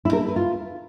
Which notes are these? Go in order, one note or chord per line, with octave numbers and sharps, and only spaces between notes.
E4
A#4
E4
B4
F4